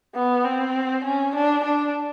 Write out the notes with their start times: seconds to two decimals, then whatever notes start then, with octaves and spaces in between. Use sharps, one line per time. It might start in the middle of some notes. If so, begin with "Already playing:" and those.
0.15 B3
0.45 C4
1.04 C#4
1.35 D4
1.64 D4